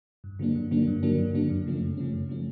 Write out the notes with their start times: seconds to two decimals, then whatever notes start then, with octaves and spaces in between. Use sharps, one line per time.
0.24 G2
0.39 D3 F#3 A#3 D4
0.55 G2
0.71 D3 F#3 A#3 D4
0.87 G2
1.03 D3 F#3 A#3 D4
1.18 G2
1.34 D3 F#3 A#3 D4
1.50 F#2
1.66 C#3 F3 A3 C#4
1.81 F#2
1.97 C#3 F3 A3 C#4
2.13 F#2
2.29 C#3 F3 A3 C#4